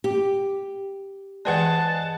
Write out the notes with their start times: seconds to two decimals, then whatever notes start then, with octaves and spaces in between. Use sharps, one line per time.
0.04 G4
1.45 E3 G#3 G#4 B4 D5 F#5 A5